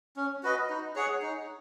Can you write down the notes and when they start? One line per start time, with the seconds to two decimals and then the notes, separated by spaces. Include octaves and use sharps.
0.17 C#4
0.43 F#4 B4 D#5
0.70 D#4
0.96 G#4 C#5 F#5
1.22 D#4